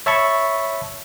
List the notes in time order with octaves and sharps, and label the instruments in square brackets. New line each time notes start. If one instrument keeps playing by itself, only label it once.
[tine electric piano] C#5 E5 A5 B5 C#6